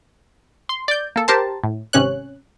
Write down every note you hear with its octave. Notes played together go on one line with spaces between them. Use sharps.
C6
D5 G6
A#3 A4
G4 A#4 C5 A5
A2
G#1 C3 C#4 C#5 F#6